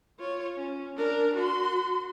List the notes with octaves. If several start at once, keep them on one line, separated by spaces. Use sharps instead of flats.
F4 C#5
C#4
D4 A#4
F#4 C6